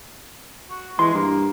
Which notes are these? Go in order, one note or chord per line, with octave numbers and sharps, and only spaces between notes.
F#4
E3 G#3 C6
G2 A#3